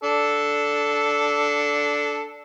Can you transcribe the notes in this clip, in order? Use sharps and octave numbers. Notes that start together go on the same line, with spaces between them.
D4 A4